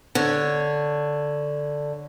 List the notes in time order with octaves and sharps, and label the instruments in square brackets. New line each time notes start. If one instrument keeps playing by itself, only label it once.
[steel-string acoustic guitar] D3 C#5